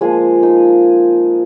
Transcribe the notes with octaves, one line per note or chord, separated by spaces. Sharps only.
F3 G#3 A#3 F4 G#4
D#4 D#5